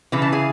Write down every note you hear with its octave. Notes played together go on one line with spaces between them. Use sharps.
C#3 E3
A5
G#4 G#5